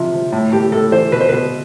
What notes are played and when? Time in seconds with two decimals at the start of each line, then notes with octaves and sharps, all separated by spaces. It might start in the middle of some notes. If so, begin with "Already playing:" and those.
Already playing: C3 F3
0.12 F3
0.32 A2
0.52 A2 G4
0.72 A2 A4
0.92 E3 C5
1.12 B2 B4
1.21 C5
1.29 B2 B4